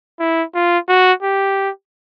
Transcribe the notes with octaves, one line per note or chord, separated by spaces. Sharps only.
E4
F4
F#4
G4